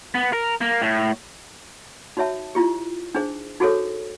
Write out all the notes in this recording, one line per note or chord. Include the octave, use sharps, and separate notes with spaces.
B3
A#4
A#3
A2
D#4 F#4 C#5 E5 A5
E4 F4 G4
D4 D#4 G#4 C5
D#4 F#4 G#4 A4 C5 C#5